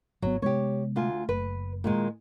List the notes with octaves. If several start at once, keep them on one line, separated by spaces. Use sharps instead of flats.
G#1 C#3 F#3 B3
C3 G#3 B3 G4 C#5
D2 F4 G#5
F#1 B4
A#2 D#3 G#3